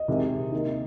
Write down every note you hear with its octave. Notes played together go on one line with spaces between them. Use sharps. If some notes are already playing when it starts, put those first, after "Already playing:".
Already playing: D#5
C3 D#3 G#3
D#3 A#3 D#4